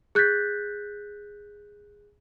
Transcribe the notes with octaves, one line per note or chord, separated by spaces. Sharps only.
G#4 F#6 G6 A6 B6